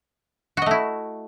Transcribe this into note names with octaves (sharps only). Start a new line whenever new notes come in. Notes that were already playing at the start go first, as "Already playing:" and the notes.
A3 E4 F#4 D#5